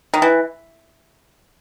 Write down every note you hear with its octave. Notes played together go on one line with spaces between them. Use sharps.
D#3
E3